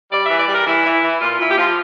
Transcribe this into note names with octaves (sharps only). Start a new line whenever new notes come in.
G3 D5
E3 E5
D5
G3
A#4
E3 E4
E3
E3
A#2 F4
A#2 E4
G4
F3 F4